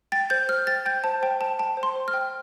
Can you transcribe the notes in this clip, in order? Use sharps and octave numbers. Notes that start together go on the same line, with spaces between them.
G5 A6
C5 G6
C5 F6
G5 A6
G5 G6
C5 A5
C5 G5
G5 A5
G5 A5
C5
C6
C5
F6
G5